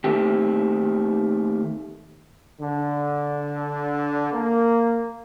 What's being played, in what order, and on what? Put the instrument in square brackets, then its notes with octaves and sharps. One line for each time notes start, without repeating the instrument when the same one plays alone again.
[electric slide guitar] D#3 A3 A#3 C4 G4
[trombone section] D3
A#3